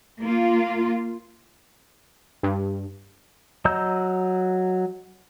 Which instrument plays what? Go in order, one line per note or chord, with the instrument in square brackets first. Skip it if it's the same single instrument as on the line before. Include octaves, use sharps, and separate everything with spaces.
[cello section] A#3 F4
[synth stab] G2
[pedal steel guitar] F#3 D#5 A#5 E6 G6